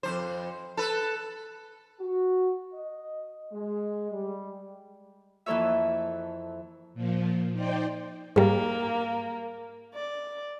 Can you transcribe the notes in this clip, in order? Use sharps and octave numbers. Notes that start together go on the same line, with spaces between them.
F2 F#3 C5
A4 B4
F#4
D#5
G#3
G3
F2 E3 A#3 A4 C#5 E5
A#2 F3
D#4 C5 D5 G5
G#2 G3 A#3
D5